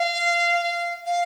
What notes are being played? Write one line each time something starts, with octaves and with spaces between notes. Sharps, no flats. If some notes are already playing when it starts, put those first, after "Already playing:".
Already playing: F5
F5